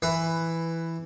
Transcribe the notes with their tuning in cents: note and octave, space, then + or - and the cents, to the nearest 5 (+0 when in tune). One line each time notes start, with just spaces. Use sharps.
E3 +0 B4 +10